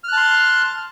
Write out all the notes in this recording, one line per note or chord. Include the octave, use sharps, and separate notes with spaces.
A5 C6 F6 F#6